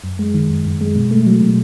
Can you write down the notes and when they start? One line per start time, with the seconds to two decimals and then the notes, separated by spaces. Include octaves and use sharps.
0.04 F#2
0.19 G#3
0.34 D#3
0.50 F#2
0.65 F#2
0.81 G#3
0.96 B2
1.11 A3
1.27 F#3
1.42 B2